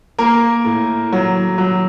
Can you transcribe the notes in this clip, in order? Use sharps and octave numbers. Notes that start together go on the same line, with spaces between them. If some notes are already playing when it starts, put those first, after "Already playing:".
A#3 A#4
A2
F#3
F#3